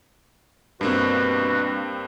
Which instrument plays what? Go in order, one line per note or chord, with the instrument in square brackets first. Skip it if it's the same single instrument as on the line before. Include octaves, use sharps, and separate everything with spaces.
[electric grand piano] G2 A#3 C4 [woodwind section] B2 G3 F#4